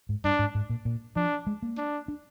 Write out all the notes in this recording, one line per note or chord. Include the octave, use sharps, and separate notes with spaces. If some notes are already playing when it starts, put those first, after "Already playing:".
G#2
G2 D4
G#2
G#2
A#2
A#2
F3 D4
G#3
A#3
D4
D4